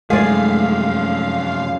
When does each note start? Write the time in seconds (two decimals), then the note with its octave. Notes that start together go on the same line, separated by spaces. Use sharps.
0.10 F#2 C3 F3 G#3 A3 G#4 D5 F5